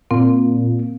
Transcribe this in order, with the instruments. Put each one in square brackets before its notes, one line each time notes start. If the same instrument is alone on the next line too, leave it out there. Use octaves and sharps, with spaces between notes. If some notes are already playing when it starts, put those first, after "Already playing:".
[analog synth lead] A#2 [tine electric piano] A#3 [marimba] C4